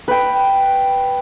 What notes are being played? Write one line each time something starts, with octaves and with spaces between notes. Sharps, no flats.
B4 G5